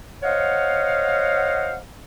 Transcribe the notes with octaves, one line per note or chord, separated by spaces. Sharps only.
C5 C#5 D#5 F5 F#5